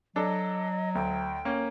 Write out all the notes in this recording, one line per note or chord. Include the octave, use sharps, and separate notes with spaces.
F#3 D4 A4 D#5
D2 G5
A#3 C#4